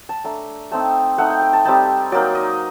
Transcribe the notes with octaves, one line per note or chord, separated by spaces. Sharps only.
A5
A3 D4 A#5
A3 C4 D#4 A5
A3 D#4 F#5
G5
G5
A5
G3 C4 D#4 A5
F#3 A#3 D#4 D5
D#5